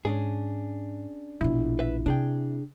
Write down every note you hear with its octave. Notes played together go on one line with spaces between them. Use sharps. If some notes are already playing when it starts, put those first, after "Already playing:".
G#2 C#4 D4 G#4
A#1 B2 E4
B4 E5
C3 D4 G#4 G5